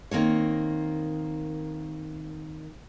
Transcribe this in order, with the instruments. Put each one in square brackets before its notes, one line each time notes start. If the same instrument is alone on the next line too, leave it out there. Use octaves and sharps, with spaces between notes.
[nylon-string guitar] D#3 A#3 C4 C#5